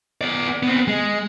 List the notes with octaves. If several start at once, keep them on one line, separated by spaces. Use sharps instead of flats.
B3 D5
B3 C4
G#3